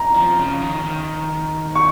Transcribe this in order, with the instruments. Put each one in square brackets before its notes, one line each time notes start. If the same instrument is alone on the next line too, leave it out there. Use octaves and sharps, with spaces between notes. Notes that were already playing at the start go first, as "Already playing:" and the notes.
Already playing: [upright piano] A#5
[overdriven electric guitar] F3
C#3
D#3
D#3
[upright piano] C#6